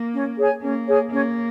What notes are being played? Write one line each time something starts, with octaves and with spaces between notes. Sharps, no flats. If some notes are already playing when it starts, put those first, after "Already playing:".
Already playing: A#3
C#4
G#4 C#5 G#5
A#3 C#4
G#4 C#5 G#5
A#3 C#4